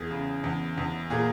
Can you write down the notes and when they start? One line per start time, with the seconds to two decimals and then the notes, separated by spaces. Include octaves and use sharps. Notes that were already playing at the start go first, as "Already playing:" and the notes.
Already playing: E2 G#4
0.11 C#3
0.44 E2
0.77 E2
1.10 A#2 G#4